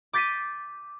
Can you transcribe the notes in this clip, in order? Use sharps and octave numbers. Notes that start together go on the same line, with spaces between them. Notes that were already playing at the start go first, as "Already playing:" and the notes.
D6 G6 A6 B6 C7 D#7